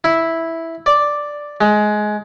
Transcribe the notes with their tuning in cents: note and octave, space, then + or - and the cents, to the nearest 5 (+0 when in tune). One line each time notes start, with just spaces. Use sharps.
E4 -5
D5 +0
G#3 +20